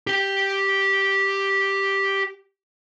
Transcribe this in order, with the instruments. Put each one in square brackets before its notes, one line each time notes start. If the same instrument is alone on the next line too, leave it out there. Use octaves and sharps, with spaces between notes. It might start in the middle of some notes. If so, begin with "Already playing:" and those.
[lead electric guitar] G4 G5